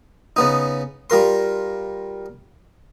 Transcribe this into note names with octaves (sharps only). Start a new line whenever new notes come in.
C#3 B3 D#4
G3 F4 A#4 C6